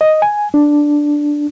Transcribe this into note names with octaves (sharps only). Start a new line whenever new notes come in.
D#5
G#5
D4